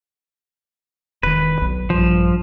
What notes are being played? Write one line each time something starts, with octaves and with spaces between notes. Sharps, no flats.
E1 D#3 B4
B1
A#1 G2 F3